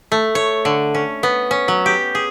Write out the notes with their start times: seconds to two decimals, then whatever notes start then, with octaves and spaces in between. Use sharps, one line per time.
0.12 A3
0.35 C#5
0.65 D3
0.95 C#4
1.23 B3
1.51 C#4
1.68 F#3
1.86 G4
2.15 G#4